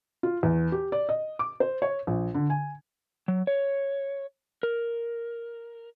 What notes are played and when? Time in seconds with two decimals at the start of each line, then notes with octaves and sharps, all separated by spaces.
0.23 F4
0.43 E2
0.72 G4
0.92 D5
1.09 D#5
1.39 D6
1.60 C5
1.82 C#5
2.07 A#1
2.34 D3
2.50 G#5
3.28 F#3
3.47 C#5
4.63 A#4